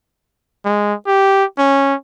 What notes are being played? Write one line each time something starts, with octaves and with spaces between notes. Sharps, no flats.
G#3
G4
C#4